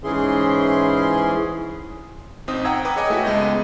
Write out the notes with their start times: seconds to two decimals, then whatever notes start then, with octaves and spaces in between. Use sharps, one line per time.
0.04 G#2 E3 C#4 E4 G#4 C6
2.48 A1 C4 D#4 D#6
2.65 F#5 G5 A#5 E6 G#6
2.85 B4 D6 D#6
2.96 G#4 C#5 D#5 G5 G#5
3.10 A3 E4 F#4 A4 B6
3.24 C#2 G#3 B3 D#5 G6